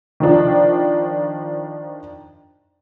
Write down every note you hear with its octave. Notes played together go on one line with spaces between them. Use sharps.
D#3 F3 D4